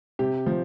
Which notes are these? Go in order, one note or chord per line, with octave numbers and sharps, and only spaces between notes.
C3 G4
F3